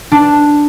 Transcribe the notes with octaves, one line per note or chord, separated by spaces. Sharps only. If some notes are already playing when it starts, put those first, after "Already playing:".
D4